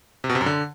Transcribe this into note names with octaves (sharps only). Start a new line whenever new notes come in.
C3
B2
C3
F#2
D3